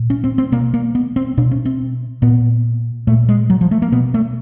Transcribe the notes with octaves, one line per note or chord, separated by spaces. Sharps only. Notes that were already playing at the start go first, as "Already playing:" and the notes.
Already playing: A#2
C#4
C4
C4
B2 A#3
A#3
B3
C4
B2 D4
C#4
C4
A#2 B3
A#2 A3
G#3
F#3
F3
A3
A#3
B2 B3
A3